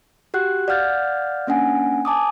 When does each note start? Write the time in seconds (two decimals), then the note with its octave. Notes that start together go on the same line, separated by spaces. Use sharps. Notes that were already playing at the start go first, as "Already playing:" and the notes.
0.34 F#4 G4 F#5 F#6
0.68 D5 F5 F#5 F6 G6 A6
1.47 A#3 C#4 D4 F#5 G#5
2.05 G#5 A5 D6 D#6